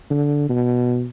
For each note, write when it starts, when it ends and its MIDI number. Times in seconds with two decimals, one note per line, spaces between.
0.11 0.47 50
0.49 1.07 47